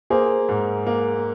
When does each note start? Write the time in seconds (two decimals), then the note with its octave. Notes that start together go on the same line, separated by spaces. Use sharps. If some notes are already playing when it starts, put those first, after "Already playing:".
0.10 A#3 G#4 C5
0.49 G#2
0.86 A#3